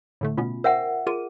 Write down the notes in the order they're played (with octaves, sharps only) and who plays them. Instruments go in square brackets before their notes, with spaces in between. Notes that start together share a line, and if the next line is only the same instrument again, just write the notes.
[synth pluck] A2 D3 A3
[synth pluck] B2 B3 C#4 [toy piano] F4
[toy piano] A#4 E5 F#5 [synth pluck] C5 G5
[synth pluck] F4 A#4 D#7 [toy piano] G#4